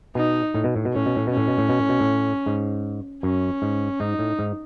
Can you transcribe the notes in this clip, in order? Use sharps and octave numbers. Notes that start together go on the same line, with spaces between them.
B2 D#4
A2
B2
A2
B2
A2 C#4
B2
A2
B2 C#4
A2
B2
A2
B2
A2
B2
A2
G#2
F#2 C#4
G#2
G#2 D#4
A2
G#2